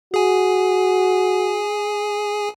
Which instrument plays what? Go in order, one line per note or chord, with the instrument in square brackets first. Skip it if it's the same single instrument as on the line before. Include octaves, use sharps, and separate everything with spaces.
[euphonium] F#4 [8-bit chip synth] G#4 G#5